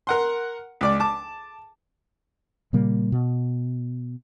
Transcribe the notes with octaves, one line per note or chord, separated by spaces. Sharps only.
A#4 F#5 C6
C#2 D5 D6
A5 D6
A#2 C#3 G3 A#3
B2